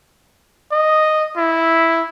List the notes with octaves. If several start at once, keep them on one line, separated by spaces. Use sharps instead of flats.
D#5
E4